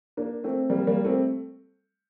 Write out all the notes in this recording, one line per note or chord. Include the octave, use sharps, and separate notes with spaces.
A#3 D4
A3 C4
G3 A#3
G3 A#3
A3 C4